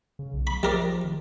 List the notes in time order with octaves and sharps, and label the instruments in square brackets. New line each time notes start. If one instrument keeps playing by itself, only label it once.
[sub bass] C#3
B1
[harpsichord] B5
[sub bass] F3 [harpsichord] G3 A#4 D5
[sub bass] D#3